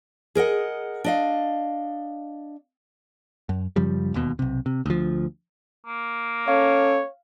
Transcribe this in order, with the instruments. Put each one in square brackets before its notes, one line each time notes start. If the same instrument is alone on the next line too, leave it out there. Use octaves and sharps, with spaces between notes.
[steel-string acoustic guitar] G#4 A#4 D#5 F#5
D4 D#5 F5
[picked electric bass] F#2
F#2 C#3 F3 G3
E1 D#2 B2
B1 C3
C3
D2 F3
[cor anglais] A#3
[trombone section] C#4 A4 [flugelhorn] C#5 [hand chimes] F5